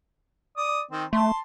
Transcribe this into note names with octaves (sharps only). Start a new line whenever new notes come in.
D5 D#6
D#3 C4
A3 A5 C6